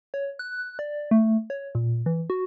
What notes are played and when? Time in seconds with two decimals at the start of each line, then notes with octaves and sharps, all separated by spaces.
0.14 C#5
0.39 F#6
0.79 D5
1.11 A3
1.50 C#5
1.75 A#2
2.06 E3
2.30 F#4